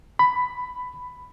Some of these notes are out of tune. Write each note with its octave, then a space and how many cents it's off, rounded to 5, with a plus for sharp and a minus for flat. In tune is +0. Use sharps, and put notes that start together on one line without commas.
B5 +10